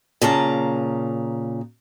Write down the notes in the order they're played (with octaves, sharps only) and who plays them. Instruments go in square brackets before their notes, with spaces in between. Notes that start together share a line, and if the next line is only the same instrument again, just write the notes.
[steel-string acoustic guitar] A#2 C#3 A5 A#5